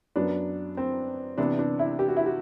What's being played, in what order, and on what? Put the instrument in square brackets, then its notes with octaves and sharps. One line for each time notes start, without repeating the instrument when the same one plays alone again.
[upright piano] F#2 F#3 B3 D4
C4
C3 E3 B3 D4
D4
E4
G4
F#4
E4
F#4